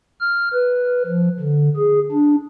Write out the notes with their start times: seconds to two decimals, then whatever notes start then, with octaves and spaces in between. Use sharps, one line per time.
0.21 F6
0.53 B4
1.07 F3
1.40 D3
1.77 G#4
2.12 D4